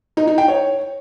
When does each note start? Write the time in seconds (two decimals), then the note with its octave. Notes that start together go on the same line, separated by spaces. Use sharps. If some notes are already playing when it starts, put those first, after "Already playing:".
0.17 D#4
0.27 D#4
0.38 G5
0.48 C#5